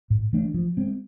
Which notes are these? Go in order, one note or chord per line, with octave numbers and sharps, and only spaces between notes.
A2
E3 A3 D4
F3
G#3 C4